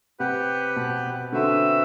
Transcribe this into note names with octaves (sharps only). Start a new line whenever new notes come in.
C3 G4 B4 F#5
B2
D3 C4 F#4 B4 E5